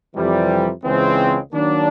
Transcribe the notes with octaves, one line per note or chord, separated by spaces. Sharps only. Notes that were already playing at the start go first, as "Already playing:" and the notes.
F2 C3 E3 G3
C#2 C#3 E3 G#3 C4
D#3 F#3 A#3 D4